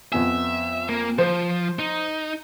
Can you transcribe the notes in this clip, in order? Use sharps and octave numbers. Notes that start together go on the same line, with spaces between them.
F2 B3 E5 G#5
A#3
F3 C5
D#4